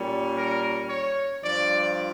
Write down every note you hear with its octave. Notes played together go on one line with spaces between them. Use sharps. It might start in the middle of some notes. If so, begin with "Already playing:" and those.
Already playing: A#2 G3 C#4
A#4
C#5
G2 F3 D5